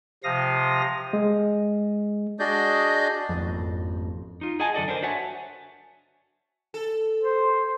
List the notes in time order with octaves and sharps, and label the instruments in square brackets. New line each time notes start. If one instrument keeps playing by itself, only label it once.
[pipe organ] C3 F3 F5 D#6 A#6
[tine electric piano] G#3
[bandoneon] D4 F#4 G#4 D5 D#5 G6
[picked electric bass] G#1 F2
[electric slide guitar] D#4 F4
G#4 D#5 F#5 G#5 A5
F#2 D3 A4 D5 D#5
D4 A#4 C5
F#4 C#5 E5 F#5 G#5 A5
[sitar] A4
[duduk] C5